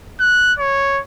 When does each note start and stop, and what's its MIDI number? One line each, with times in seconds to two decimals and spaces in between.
0.20 0.53 90
0.59 1.00 73